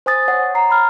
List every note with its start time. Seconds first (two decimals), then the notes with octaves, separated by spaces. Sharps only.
0.06 C5 G#5 D#6 A6
0.28 C#5 F#5
0.54 F#5 A#5 C7
0.70 B5 F6